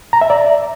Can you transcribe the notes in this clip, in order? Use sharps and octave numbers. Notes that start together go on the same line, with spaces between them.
A#5
E5
D5